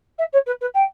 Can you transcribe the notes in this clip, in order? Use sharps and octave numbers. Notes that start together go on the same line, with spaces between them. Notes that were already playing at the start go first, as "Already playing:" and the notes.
E5
C#5
B4
B4
G5